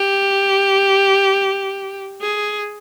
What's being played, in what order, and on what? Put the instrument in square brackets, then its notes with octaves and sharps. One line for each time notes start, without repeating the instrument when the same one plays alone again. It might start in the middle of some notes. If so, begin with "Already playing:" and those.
Already playing: [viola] G4
G#4